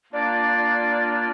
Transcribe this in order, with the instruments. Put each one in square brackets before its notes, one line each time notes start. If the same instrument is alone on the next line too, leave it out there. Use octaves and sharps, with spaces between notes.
[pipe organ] A#3 D4 F4 [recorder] D5